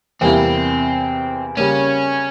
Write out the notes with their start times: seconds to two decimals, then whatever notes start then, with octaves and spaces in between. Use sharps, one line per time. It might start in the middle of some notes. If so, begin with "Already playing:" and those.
0.21 E2 C3 G3 A#3 C4 E4
1.57 C#3 G3 A#3 C#4